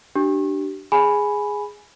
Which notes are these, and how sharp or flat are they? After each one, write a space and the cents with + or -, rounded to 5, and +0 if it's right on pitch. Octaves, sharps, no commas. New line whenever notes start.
D4 +15 G4 -30
G#4 -5 G#5 +10 B5 +0